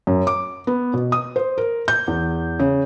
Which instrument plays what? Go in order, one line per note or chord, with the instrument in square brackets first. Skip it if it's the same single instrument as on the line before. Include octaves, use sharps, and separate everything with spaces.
[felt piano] F#2
D6
B3
B2
D#6
C5
A#4
G6
E2
C#3